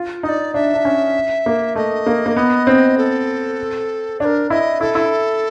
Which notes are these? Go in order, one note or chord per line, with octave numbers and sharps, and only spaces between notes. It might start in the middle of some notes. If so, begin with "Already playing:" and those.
Already playing: F4
D#4 D#5
D5
D4 E5
D4
C#4
A#3
A3 D#5
A#3
A#3
B3
C4
A4
D4 A#4 C#5
E4 D#5
E4 A4
E4